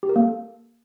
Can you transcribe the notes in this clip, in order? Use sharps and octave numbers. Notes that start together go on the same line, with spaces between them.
G4
A#4
A#3
A4